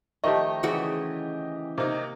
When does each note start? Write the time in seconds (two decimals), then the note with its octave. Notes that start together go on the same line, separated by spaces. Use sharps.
0.24 D#3 F3 A3 G4 D#5
0.63 C#3 E3 F#4
1.78 C3 A#3 D#4